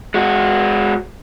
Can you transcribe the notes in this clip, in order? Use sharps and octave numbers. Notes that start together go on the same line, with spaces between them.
G#3 F#4